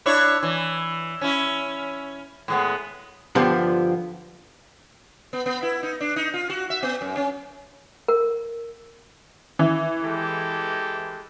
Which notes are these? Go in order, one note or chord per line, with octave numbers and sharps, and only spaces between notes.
D4 E4 C#5
E3
C#4 E4
A2 G#3 B3
G2 D3 F3 B3 F4 G4
B3
B3
E4
D#4
D4
D#4
F4
F#4
E5
B3
F#2
C#4
A#4
E3
G#3 G4 A4